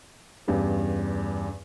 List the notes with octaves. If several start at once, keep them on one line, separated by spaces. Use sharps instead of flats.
E2 G2 C#3